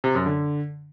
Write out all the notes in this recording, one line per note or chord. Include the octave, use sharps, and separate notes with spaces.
C3
F#2
D3